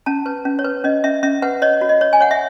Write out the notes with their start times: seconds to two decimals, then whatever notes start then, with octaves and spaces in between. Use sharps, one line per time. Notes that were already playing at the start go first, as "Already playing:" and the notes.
0.06 C#4 A5
0.26 B4
0.45 C#4
0.59 C#5
0.65 B4
0.84 C#4 D#5
1.04 C#4 E5
1.23 C#4 E5
1.42 B4 F#5
1.62 C#5 D#5
1.81 F#4
1.89 D#5
2.01 C#5
2.13 G#5
2.20 C#5 F#5
2.31 E5